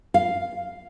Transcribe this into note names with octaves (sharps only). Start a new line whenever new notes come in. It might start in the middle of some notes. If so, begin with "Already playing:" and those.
F5